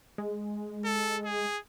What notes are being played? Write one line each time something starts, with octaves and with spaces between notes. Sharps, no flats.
G#3
A4
G#4